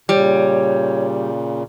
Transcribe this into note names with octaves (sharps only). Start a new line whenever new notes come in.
A#2 C#3 G3 C#5